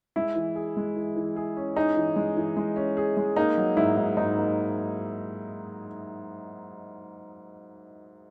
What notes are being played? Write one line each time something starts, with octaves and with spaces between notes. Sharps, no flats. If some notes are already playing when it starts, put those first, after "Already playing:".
G#3 E4
E3
G#4
G#3
E3
E3
G#4
C#4
D#4 G#4
E3
G#3
E3
G#3
C#4
G#4
G#3
A#3 D#4
F#3
G#2 E4
G#2
G#2 D#4
A#3